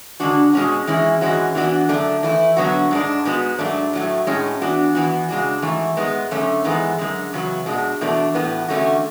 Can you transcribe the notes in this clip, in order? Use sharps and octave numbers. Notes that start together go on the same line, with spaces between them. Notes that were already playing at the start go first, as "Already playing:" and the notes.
D3 G#3 D4 F#4
B2 G#3 C#4 F#4
E3 G#3 C#4 E4
G#2 E3 G#3 C#4 F#4
E3 B3 D4 F#4
F#2 D3 A3 D4
E3 A3 E4
D3 F#3 B3 F#4
G#2 G#3 D4
G#2 G#3 B3 F#4
G#2 F#3 A3 D4
A2 F#3 A3
A2 G#3 C#4
E3 B3 D4 F#4
E3 B3 F#4
C#3 G#3 D4 F#4
G#2 E3 A3
G#2 G#3 B3
F#2 D3 A3 C#4
G#2 E3 G#3 B3
F#2 D3 G#3
E2 C#3 F#3 B3
B2 G#3 D4
E2 B2 A3 D4
A2 E3 B3
E2 D3 A3 C#4 F#4